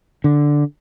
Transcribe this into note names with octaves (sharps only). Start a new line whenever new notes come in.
D3